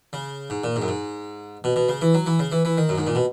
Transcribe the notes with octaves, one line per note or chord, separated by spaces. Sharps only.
C#3
G#2
A#2
G#2
F#2
G#2
B2
B2
C#3
E3
F#3
E3
C#3
E3
E3
D#3
F#2
G#2
A#2
B2